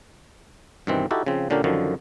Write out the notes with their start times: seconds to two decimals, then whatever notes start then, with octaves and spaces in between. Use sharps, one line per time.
0.87 G2 B2 D#3 E3 C4
1.11 D#4 E4 F#4 G4 A4
1.26 C#3 F3 C4
1.50 A#2 D3 C#4 D4 G4 A#4
1.64 F#2 D3 D#3 F3